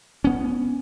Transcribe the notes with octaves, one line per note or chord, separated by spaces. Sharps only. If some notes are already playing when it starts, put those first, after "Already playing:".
B3 C#4